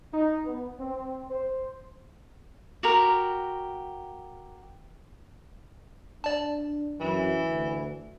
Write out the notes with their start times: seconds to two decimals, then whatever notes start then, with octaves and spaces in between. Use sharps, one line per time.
0.13 D#4
0.45 B3
0.80 C4
1.30 C5
2.83 F#4 G4 A#4
6.24 D4 D5 A5
7.00 F#2 E3
7.47 D2